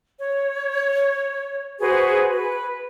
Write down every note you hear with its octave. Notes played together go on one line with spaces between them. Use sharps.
C#5
F#4 G#4 B4 C5
B4